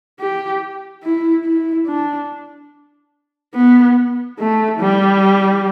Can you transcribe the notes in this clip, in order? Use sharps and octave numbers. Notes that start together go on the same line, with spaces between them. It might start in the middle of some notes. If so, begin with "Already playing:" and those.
G4
E4
E4
D4
B3
A3
G3